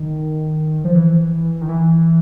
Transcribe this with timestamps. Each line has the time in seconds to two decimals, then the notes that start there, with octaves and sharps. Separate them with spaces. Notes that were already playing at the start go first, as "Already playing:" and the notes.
Already playing: D#3
0.84 F3
0.95 E3
1.61 D#3
1.69 E3